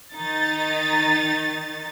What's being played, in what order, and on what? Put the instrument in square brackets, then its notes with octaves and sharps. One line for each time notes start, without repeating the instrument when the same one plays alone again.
[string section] D#3 D#4 A6